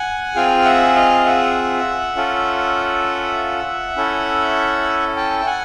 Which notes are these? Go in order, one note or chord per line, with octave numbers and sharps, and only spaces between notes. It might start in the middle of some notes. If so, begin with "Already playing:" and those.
Already playing: F#5 G#5
C4 F4 G#4 F5 G5
E5 F#5
D#5 F5
E5 F#5
C#4 F4 A4
C#4 E4 A4
G5 A5
A5
F#5 G#5